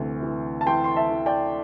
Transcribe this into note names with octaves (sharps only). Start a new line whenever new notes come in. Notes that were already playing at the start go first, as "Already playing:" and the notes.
Already playing: D2 C3 E3
E3
A5
E3 G5 C6
C6
E5 A5
E3
D5 G5